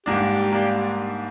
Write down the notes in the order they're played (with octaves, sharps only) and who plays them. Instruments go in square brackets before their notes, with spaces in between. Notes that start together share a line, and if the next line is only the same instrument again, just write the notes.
[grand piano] G#2 G3 A#3 D4 [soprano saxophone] G4
[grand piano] G3 A#3 D4